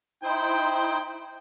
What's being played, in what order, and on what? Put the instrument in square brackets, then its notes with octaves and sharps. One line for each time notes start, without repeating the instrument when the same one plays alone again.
[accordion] D#4 E4 C5 [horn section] G5